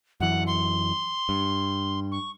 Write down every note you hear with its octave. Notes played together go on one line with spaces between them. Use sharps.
F#2 E3 F#5
C6
G2
C#6